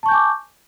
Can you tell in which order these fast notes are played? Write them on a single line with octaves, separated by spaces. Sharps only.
A5 C#6 G6 G#5 D6